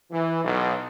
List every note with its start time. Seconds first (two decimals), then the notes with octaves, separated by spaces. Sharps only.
0.11 E3
0.44 B1